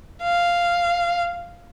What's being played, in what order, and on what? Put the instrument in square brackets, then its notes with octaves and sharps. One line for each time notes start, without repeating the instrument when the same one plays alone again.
[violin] F5